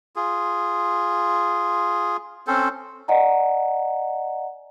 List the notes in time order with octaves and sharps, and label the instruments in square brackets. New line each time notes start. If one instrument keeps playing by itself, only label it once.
[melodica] F4 G#4
C4 C#4 A4 C5
[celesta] D5 D#5 F#5 G#5 A#5